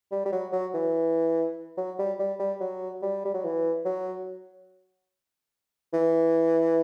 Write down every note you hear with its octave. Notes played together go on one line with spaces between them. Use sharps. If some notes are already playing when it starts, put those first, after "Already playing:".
G3
G3
F#3
F#3
E3
F#3
G3
G3
G3
F#3
G3
G3
F#3
E3
F#3
E3